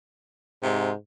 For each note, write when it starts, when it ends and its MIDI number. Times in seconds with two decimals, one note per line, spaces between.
0.63 0.95 44
0.63 0.90 48